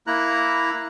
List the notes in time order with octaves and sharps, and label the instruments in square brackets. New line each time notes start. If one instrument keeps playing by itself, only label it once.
[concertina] A#3 E4 A#5 F#6